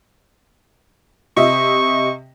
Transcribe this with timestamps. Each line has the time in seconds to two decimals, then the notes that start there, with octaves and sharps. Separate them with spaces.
1.37 C3 D#5 E5 C#6